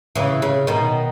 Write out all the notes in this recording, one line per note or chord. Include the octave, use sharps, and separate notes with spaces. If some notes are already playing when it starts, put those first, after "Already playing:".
C#3 E3
C#3
B2 D#3